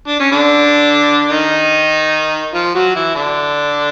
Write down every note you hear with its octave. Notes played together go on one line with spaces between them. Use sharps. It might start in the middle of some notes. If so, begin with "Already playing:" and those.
D4
C#4
D3 D4
D#3 D#4
F3 F4
F#3 F#4
E3 E4
D3 D4